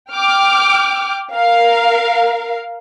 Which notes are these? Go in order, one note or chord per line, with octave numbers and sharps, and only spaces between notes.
G5 D6 F6
A#4 F5